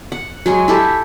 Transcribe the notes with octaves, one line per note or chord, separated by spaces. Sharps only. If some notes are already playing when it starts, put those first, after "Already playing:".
F#5
F#3 G#3 G#4
E4 G4 A4